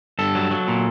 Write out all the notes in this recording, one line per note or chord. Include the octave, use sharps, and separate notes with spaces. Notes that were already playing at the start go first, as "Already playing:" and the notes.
G2 A4
F#3
F#3
A#2